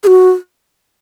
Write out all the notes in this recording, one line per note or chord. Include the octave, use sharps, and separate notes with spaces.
G#4
F#4